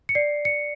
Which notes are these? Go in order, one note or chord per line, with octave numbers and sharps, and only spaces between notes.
C#7
D5 C7
C#7